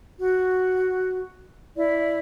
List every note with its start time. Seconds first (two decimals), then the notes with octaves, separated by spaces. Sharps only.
0.19 F#4
1.77 E4 D5